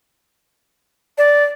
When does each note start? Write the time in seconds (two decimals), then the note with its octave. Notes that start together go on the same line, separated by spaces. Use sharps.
1.18 D5